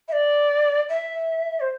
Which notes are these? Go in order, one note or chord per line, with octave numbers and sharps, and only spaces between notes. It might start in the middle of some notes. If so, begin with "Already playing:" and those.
E5
D5
E5
C5